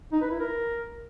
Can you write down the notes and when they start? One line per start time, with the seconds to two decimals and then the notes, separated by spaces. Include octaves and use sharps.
0.12 D#4
0.22 B4
0.31 E4
0.40 A#4